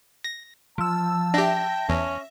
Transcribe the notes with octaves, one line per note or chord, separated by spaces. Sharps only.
A#6
F3 A5 E6
D4 G4 E5 G5 A#6
E2 C#4